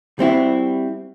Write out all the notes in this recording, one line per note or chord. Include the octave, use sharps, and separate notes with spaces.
G3 C4 E4 F#4